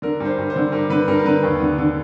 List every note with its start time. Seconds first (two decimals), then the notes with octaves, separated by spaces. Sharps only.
0.02 D3 A#4
0.20 G2
0.25 C5
0.38 G2
0.50 C5
0.56 D3
0.72 G2 A#4
0.90 D3 B4
1.08 G2 A#4
1.19 A#4
1.25 D3 B4
1.43 D#2
1.60 D3
1.78 D3